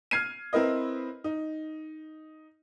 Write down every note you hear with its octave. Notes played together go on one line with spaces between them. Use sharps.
F6 G#6 C7 D#7
C4 E4 A#4 B4 D#5
D#4